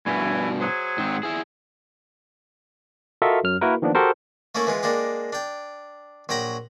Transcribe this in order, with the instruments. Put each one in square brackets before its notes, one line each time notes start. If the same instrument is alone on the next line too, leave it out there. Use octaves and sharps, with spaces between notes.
[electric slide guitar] G2 B2 [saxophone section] E3 C#4 E4
[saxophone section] F#3 G#4 C5
[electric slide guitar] G#2 C4
E4 G#4
[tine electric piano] F4 F#4 A4 A#4 D#5 E5
F#2 F#3 F6
A#3 E4 F#4 A#4 B4
D#3 F3 A#3 B3 D4
F#4 G4 A4 A#4 C5
[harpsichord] A3 A#3 C#4 E4
E3 G#3 F4
G#3 A#3 D4 G4
D4 G5
A#1 F#3 G5 A#5 B5